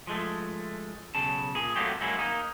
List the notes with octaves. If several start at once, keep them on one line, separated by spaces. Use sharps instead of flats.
F3 G#3 A3
B1 C#3 A5
A#2 G#4
F#3 A3 A#3 C4 G4
F#3 G#3 A#3 C#4 E4
A#3 D#4